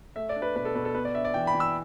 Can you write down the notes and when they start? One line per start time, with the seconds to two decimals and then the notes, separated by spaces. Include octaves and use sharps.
0.16 A3 E5
0.29 D5
0.36 D4
0.42 B4
0.55 B2 B4
0.65 A4
0.75 B2 B4
0.85 A4
0.95 B3 B4
1.05 D5
1.14 D4 E5
1.25 D5
1.34 E3 G5
1.47 B5
1.55 E3
1.60 E6